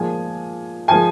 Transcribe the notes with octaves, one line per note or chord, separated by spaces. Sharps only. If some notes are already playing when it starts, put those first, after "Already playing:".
Already playing: A#2 F3 G#3 G#5
F3 G#3 G#5